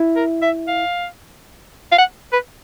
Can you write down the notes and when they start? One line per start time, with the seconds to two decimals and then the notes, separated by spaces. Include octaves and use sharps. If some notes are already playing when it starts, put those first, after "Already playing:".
Already playing: E4
0.16 A#4
0.42 E5
0.68 F5
1.92 F5
1.98 F#5
2.33 B4